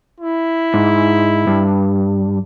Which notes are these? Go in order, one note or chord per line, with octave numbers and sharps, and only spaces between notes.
E4
G#2
G2